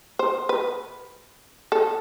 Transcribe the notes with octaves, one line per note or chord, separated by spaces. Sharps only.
C5
B4
A4